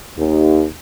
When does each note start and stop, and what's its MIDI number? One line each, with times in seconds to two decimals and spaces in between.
0.18 0.64 39